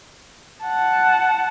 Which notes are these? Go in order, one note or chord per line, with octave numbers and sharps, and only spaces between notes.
F#5 A5